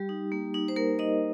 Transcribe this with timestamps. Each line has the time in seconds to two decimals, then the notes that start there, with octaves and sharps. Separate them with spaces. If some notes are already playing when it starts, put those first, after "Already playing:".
Already playing: G3 G4
0.09 D#4
0.32 A#3
0.54 D#4
0.68 C5
0.76 A#3 A#4
0.99 D#4 D#5